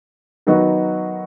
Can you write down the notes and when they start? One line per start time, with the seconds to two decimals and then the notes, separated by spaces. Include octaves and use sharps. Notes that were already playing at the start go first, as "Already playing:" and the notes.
0.47 D#3 F#3 B3 D#4 F#4